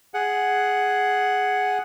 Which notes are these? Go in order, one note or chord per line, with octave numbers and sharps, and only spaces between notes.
G#4 F#5